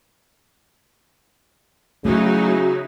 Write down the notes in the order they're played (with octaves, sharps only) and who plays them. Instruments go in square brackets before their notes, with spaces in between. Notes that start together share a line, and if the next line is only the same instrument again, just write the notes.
[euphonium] C#3 [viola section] F#3 D#4 E4 [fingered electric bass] A3 [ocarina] F#4